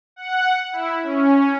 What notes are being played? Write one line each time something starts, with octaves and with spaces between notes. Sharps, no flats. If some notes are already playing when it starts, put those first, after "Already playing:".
F#5
E4
C#4